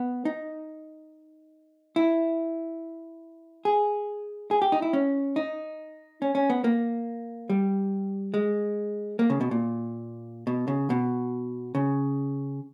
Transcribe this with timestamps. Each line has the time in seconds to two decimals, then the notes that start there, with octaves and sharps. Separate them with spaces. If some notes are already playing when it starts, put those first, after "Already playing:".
Already playing: B3
0.25 D#4
1.96 E4
3.65 G#4
4.51 G#4
4.62 G4
4.72 D#4
4.82 E4
4.93 C#4
5.36 D#4
6.22 C#4
6.35 C#4
6.50 B3
6.64 A#3
7.50 G3
8.34 G#3
9.19 A#3
9.30 C#3
9.41 B2
9.51 A#2
10.47 B2
10.68 C#3
10.90 B2
11.75 C#3